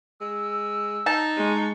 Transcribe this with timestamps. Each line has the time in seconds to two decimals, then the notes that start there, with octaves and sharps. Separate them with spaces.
0.21 G#3 E6
1.06 D#4 A5
1.36 G#3 C#6